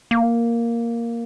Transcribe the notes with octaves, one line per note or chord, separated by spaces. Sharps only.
A#3